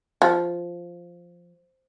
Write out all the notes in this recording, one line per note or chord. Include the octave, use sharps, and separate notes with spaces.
F3